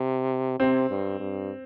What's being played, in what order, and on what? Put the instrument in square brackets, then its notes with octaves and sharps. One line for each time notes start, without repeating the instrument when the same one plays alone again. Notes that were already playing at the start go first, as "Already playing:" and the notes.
Already playing: [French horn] C3
[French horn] C3 [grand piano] C4
[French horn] G2
G2